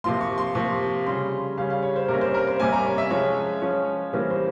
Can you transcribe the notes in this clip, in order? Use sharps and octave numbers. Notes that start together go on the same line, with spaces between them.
C3 F3 A#3 C6
C#6
C6
C3 F3 A#3 C#6
C#3 G3 C#4 C6
C#3 G3 C#4 F5
F5
C#5
C5
C3 G3 A#3 C#4 A#4
C5
A#4
C5
C3 G3 A#3 C#4 G#5
A#5
C#5
E5
F3 G#3 C#4 C#5
F3 G#3 C#4 C#5
C3 E3 G3 A#3 C#4 C5
C5